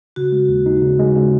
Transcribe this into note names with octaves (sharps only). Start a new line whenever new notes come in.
C#3 F#4
G#3
D#2
D#4
C#3
G#3
C#3